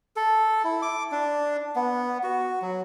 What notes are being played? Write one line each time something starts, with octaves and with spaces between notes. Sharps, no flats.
A4
E4
D6
D4
B3
F#4
F#3